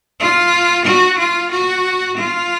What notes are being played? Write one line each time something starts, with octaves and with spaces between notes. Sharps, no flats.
F4
F#4
F4
F#4
F4